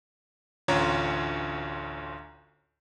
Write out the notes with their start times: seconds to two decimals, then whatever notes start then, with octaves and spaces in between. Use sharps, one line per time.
0.68 A1 D2 C#4 F4 C#5 A#5